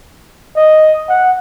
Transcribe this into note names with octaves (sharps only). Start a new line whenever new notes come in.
D#5
F#5